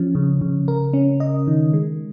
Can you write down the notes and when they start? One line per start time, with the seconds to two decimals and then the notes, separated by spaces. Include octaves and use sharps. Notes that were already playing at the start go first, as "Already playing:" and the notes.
Already playing: F3 C#4
0.15 C#3
0.41 C#3
0.68 A#4
0.93 C#4
1.20 D#5
1.47 D#3
1.73 G#3